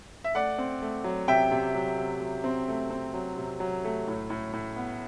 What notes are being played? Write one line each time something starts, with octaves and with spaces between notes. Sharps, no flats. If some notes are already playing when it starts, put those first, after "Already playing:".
E5
A3 D5 F#5
C4
A3
F#3
C3 E5 G5
C3
F#3
C3
F#3
C4
A3
C4
F#3
C3
F#3
A3
A2
A2
A2
B3